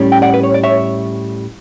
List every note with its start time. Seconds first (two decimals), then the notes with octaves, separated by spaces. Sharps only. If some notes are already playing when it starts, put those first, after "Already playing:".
Already playing: A2 G3 C#4
0.12 G5
0.22 D5 F#5
0.34 B4
0.43 C#5
0.54 D5
0.63 C#5 E5